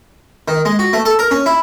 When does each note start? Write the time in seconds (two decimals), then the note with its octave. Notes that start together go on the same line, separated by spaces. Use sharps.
0.48 D#3
0.65 G#3
0.79 F#4
0.93 A3
1.05 A4
1.19 A#4
1.31 C#4
1.46 E4